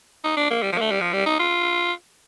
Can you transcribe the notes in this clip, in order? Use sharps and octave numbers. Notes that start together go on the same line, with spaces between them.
D#4
D4
A#3
G3
F3
A#3
A3
G3
F3
G3
D#4
F4